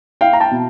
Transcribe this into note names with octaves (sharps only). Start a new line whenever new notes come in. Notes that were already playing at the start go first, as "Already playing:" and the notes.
E4 F5 G5
A#5
G5 A5
B2